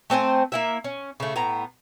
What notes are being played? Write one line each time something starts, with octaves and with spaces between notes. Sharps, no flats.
A3 C4 C5 G#5
A#3 E4 E5
C#4
C#3 A3
A2 B3 A#5